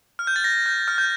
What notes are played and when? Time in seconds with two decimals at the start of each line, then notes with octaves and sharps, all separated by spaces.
0.19 F6
0.27 G6
0.36 A6
0.44 A#6
0.66 G6
0.88 F6
0.98 G6